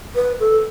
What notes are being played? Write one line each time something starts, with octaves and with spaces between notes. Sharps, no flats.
B4
A4